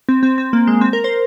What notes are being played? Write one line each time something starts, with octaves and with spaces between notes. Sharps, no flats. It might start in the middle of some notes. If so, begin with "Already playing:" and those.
C4
C4
C4
A#3
G#3
C4
A#4
C5